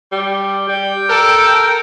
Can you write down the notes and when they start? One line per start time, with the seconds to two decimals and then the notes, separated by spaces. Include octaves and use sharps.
0.12 G3
0.69 G3 G5
1.09 A4 A#4